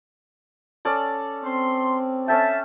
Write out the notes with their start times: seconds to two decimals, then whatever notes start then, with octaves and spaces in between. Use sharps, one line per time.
0.85 C#4 A4 D5
1.44 C4 C6
2.28 C#4 A4 E5 G5 A5